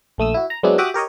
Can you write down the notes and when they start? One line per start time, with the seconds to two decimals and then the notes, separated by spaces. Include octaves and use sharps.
0.18 A#1 A3 D#6 E6
0.34 E4 F#4
0.50 A#5
0.63 F#3 G#3 B3 C4 D4 E4
0.78 F#4 G4 E5 D6 D#6 F#6
0.94 G4 A#4 C#5 D#5